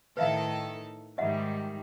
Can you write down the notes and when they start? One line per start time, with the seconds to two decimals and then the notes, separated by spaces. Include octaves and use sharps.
0.17 A2 D#3 A4 B4 E5 F5
1.18 G#2 D#3 G3 D#5 E5 F#5